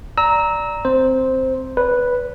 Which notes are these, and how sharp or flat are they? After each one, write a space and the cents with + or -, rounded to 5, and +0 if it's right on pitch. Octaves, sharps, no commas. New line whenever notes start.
D5 -5 A#5 +0 E6 -25
C4 +0 C5 +0
B4 -5 D5 -45